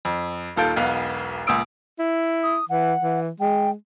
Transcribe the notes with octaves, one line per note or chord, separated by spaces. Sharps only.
F2
D#1 D#2 F4 A4 G6 D7
E1 B1 B3 F5
C#2 A#2 D#6 E6 D7
E4
D#6
E3 F#5
E3
G#3 G5